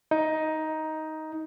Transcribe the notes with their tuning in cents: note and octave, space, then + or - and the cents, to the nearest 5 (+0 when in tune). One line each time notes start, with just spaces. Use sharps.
D#4 +10